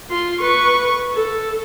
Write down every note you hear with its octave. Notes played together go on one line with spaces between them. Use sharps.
F4 C6
B4 C#6
A4